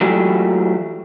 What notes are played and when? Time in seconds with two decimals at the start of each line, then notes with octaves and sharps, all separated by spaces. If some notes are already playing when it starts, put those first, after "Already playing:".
0.01 E3 F#3 A3 G4